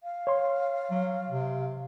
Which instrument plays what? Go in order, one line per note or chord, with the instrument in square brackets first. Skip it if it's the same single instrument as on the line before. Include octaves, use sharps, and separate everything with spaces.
[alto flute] F5
[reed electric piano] C#5 C6
[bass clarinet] F#3
C3